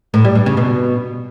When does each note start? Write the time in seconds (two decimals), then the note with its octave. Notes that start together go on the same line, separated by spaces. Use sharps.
0.14 A2
0.25 G3
0.35 G2
0.46 C#3
0.57 B2